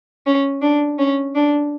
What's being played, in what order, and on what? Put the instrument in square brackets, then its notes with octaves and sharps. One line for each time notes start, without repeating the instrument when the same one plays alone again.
[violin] C#4
D4
C#4
D4